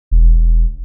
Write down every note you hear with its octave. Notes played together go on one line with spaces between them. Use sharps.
E1